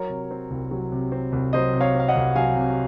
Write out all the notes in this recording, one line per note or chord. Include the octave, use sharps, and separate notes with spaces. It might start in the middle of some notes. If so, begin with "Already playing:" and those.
Already playing: F#3 A#4 C#5
C3
C4
C2
F#3
C3
C4
C2
F#3 C5 D#5
C3
C#5 F5
C4
F5
D#5 F#5
C2
F#3 F5 G#5
C3